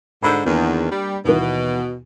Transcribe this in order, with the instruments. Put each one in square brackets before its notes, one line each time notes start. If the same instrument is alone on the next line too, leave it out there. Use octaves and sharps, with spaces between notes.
[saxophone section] G#2 D3 [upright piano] B5 E6 G6
[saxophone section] E2 D#3 [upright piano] A#3 D4
[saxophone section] G3
[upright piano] D#2 E3 [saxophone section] B2